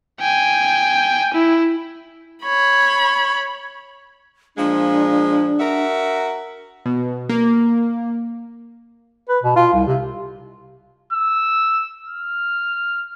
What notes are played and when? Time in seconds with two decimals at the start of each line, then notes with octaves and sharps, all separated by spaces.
0.20 G5 G#5
1.33 E4
2.43 C#5 B5
4.57 A#2 F3 G#3 D4
5.60 F#4 A#4 E5
6.86 B2
7.29 A#3
9.29 B4
9.43 B2
9.56 F4
9.73 C2
9.87 C3
11.13 E6
12.08 F6